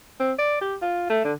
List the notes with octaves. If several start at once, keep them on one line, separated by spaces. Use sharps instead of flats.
C4
D5
G4
F4
A3
D3